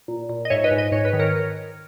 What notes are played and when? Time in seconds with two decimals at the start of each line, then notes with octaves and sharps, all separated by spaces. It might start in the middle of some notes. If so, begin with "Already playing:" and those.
0.08 A#2
0.29 A#2
0.45 D#5
0.50 G#2 C#5 E5
0.64 B4 D#5
0.71 G#2
0.78 D#5
0.92 G#2 C#5
1.05 B4
1.13 D#3
1.19 A#4 C#5